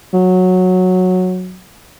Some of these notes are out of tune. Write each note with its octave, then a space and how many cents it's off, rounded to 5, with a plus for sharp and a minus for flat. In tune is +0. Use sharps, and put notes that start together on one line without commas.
F#3 -10